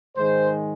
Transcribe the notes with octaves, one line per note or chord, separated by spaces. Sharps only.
G#2 D#3 G#3 C5